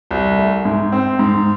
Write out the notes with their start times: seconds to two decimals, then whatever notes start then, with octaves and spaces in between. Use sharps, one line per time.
0.11 C2
0.38 A3
0.65 G#2
0.92 C4
1.19 G#2